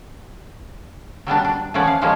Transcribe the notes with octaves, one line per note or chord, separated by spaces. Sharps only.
F#3 G3 B3 D4
D4
E3 F3 C#4 D5 F#5
F5
E3 F3 G3 G#3 A#3 C#4